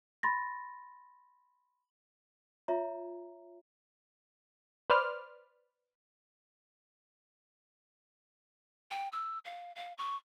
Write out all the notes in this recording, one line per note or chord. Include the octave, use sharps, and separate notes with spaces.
B5 C6 A6 A#6
F4 C#5 E5 A#5
B4 C5 D5 F6
G5
E6
F5
F5
C#6